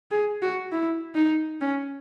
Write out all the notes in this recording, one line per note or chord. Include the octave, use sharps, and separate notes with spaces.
G#4
F#4
E4
D#4
C#4